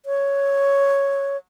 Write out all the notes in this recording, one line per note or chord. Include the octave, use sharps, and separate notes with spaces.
C#5